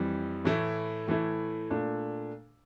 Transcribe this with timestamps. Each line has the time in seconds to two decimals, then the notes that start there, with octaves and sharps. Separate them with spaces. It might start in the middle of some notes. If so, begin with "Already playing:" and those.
Already playing: F2 E3 G3
0.44 A2 E3 A3 E4
1.07 A2 E3 A3 E4
1.70 A#2 A3 D4